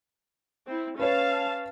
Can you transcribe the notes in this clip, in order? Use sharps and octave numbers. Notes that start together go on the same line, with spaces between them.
C4 E4
C#4 B4 C#5 F5 A5